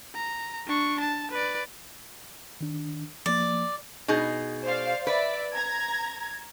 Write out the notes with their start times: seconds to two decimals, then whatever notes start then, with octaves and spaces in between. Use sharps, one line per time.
0.15 A#5
0.67 D4 C#6
1.00 A5
1.32 B4 D5
2.61 D#3 D4
3.26 F3 A#3 D5
4.08 B2 D#4 G#4
4.63 C5 D5 F5
5.07 B4 D5 E5
5.54 A#5 G#6